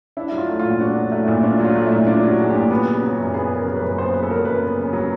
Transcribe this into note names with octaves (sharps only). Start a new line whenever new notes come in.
D4 E4
F#3
F4
A3
A#2 F4
D4 F#4
F#3
A3 E4
A#2 E4
D4 F4
F#3
F4
A3
A#2 E4
D4 F4
F#3
F#4
A3 G#4
G4
A#2
B3
C#3
F#3
F#2
B3 G#4
C#3
A#4
F#3
B4
F#2
B3 C5
C#3 B4
A4
F#3 A#4
F#2 B4
B3
C#3
F#3